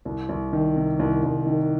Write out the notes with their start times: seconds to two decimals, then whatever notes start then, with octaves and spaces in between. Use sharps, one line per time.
0.05 C2
0.29 C2
0.53 D#3
0.76 C3
0.99 C2
1.23 C2
1.46 D#3